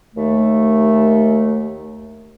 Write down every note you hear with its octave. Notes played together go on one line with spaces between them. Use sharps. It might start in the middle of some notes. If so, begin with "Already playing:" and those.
D#2 A3